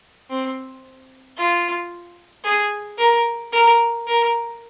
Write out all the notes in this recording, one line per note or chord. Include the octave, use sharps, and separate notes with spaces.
C4
F4
G#4
A#4
A#4
A#4